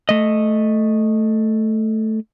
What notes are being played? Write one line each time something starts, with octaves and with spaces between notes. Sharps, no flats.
A3 D#5